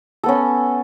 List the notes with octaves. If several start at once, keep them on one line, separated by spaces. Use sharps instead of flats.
B3 C#4 A4